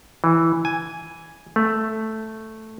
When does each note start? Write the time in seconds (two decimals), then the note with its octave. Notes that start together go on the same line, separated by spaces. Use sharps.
0.24 E3
0.65 G#5
1.56 A3